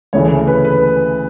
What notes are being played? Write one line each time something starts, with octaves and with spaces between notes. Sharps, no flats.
D2 C#3 E3 A3 C#5
B4
B4